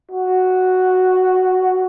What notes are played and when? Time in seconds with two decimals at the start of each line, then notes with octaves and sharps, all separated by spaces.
0.11 F#4